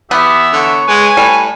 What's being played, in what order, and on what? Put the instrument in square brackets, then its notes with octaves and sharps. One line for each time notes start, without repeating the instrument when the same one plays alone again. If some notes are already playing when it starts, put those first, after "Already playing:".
[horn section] E3 E5 [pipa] B3 [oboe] G4
[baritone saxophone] D3 [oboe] C#5
[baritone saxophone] G#3 [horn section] B4 G#5
[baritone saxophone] A2 [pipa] G3